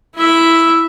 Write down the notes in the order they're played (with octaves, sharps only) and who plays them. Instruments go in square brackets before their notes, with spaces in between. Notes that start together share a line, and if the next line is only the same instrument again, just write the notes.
[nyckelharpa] E4 E5